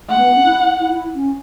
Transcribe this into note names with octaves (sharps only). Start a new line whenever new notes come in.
A3 F#5
B3
C#4
E4
E4
E4
C#4